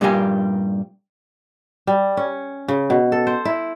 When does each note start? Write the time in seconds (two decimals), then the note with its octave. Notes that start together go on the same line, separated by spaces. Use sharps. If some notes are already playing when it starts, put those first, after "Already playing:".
0.01 G2 A#2 G3 A#3 G4 G#5
1.87 G3
2.17 C#4
2.68 C#3
2.90 B2
3.12 A4
3.27 C5
3.45 E4